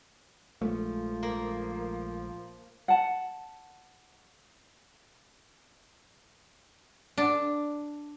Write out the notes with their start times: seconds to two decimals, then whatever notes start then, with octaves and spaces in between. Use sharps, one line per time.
0.62 A#1 F3 G#3 A3
1.23 A#3
2.88 F#5 A5
7.18 D4